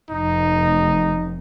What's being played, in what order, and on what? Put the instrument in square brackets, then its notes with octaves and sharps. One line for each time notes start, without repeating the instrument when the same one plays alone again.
[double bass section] F1 [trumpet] D#4